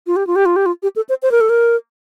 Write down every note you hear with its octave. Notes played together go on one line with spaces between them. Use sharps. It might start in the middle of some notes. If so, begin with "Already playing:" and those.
F4
G4
F4
G4
F4
G4
F4
G4
A4
C5
C5
A#4
A4
A#4